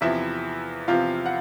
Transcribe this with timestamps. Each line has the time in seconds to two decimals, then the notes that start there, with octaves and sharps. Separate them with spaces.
0.01 E2 C3 F3 E4 E5
0.88 E2 C3 F3 F4 F5
1.26 F#5